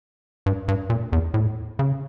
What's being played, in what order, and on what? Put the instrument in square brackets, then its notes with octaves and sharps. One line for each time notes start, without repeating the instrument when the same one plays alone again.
[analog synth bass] G2
G2
A#2
E2
A2
C#3